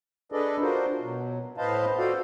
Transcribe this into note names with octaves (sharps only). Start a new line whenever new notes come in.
D4 G#4 A4 B4 D5 D#5
D4 F4 F#4 A#4 C5
B2 F#3
A2 B4 C5 D#5 F5 A5
F4 F#4 A4 C5 D5 F5